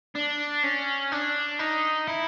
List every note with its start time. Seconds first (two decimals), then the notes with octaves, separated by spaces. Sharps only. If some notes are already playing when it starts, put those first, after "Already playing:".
0.15 D4
0.64 C#4
1.12 D4
1.60 D#4
2.07 E4